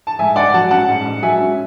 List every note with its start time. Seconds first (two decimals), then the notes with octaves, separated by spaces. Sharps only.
0.07 A5
0.19 G#2 E5 G#5
0.36 G#2 D5 F#5
0.54 F#3 F#5 A5
0.71 C#4 F#5 A5
0.89 G#2
1.05 G#2
1.22 F#3 E5 G#5
1.40 C#4